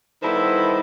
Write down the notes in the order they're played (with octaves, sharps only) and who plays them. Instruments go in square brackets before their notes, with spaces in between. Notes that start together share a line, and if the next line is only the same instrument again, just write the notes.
[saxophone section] D#3 G3 B3 E4 A4 C5